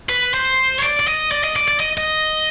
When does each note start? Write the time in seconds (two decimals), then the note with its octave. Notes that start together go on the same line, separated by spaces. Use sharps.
0.09 B4
0.34 C5
0.78 C#5
0.83 D5
0.99 D5
1.07 D#5
1.31 D5
1.44 D#5
1.56 D5
1.68 D5
1.80 D#5
1.98 D#5